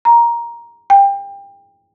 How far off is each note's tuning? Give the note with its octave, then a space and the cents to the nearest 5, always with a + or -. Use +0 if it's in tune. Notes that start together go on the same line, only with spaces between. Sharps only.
A#5 +10
G5 +25